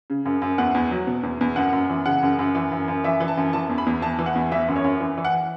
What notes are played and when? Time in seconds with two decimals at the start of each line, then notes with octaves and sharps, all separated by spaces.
0.10 C#3
0.25 F#2
0.42 F#2
0.58 E2 F#5
0.75 E2
0.91 F#3
1.07 B2
1.23 E2
1.41 E2
1.56 F#2 F#5
1.73 F#2
1.90 E3
2.06 C#3 F#5
2.23 F#2
2.39 F#2
2.55 E3
2.72 F#2
2.88 F#2
3.04 E3 E5
3.20 E3
3.28 A5
3.37 F#2
3.53 E3 A5
3.69 E2
3.78 B5
3.86 E2
4.02 E3 A5
4.18 E3
4.26 F#5
4.35 E2
4.52 E3 E5
4.68 F#2
4.76 C#5
4.84 F#2
5.00 E3
5.17 E3
5.25 F#5